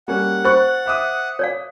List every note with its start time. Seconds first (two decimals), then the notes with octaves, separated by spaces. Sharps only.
0.08 G3 A#3 C#4 F#5
0.45 C5 C#6 F#6 A6
0.86 E5 D6 D#6
1.39 C#5 D5 F5